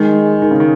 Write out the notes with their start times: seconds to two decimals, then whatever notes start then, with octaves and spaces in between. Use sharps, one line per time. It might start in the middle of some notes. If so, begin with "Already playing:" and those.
Already playing: D#3 G#3
0.42 D#3
0.51 C#3
0.60 D#3